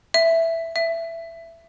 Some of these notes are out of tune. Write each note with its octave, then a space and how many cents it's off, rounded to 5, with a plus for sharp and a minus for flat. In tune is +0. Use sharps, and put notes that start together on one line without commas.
E5 +5
E5 +15